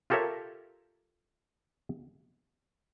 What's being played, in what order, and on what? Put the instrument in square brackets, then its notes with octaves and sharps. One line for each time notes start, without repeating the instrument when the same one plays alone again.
[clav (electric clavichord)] F4 G4 A4 A#4 C#5 E5